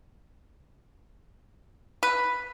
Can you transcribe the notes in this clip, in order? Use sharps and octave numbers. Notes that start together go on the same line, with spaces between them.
B4